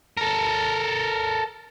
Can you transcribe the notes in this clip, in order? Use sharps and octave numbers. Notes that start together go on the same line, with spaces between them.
A4 A#4